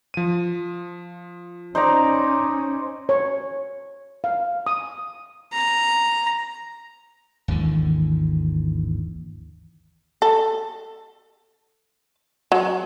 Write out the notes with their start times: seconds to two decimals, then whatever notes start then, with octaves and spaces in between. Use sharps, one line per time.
0.14 F3 D#7
1.75 C#4 D#4 C5 D5 A#5
3.09 C#5
4.24 F5
4.67 D#6
5.53 A#5
7.48 G#1 D#2 D3 E3
10.22 A4
12.52 F#3